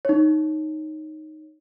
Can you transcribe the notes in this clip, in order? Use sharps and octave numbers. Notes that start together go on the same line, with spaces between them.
D#4 C#5